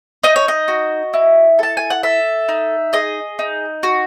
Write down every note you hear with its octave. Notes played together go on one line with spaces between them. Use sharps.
D#4 D#5
C#5
D#5
F#4
E4
A4 A5
G#5
F#5
A4 E5
D#4
G#4 D#5
D#4
F#4